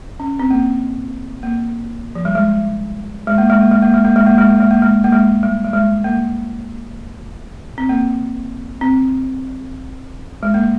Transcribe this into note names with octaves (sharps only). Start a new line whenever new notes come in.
C#4
C4
A#3
A#3
F3
G3
G#3
G#3
A#3
G#3
A#3
G#3
A#3
G#3
A#3
G#3
A#3
G#3
A#3
G#3
A#3
G#3
A#3
G#3
G3
G3
G#3
A#3
C4
A#3
C4
G#3
A#3